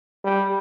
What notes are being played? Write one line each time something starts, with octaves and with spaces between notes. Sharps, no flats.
G3